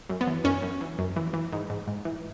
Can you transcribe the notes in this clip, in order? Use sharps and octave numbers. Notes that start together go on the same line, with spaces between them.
F#2
B3
E3
F#2 C#4
F#2
E3
F#2
E3
E3
G#2
G#2
G#2
E3